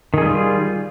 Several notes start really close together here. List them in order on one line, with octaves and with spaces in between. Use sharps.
D#3 G#4 G3 F4